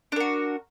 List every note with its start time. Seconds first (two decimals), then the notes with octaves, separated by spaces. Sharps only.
0.12 D4
0.16 A#4
0.20 F#4